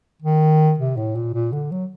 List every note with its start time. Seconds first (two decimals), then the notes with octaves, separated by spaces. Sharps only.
0.22 D#3
0.78 C3
0.97 A2
1.15 A#2
1.34 A#2
1.52 D3
1.71 F#3